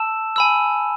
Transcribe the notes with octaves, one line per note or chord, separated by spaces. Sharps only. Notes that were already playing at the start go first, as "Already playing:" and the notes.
Already playing: A5 E6 E7
G#5 B5 E6